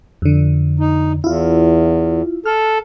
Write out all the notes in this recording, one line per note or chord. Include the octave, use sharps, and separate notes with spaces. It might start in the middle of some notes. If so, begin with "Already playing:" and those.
F2 D3
D#4
E2 E4 F4
A4 F6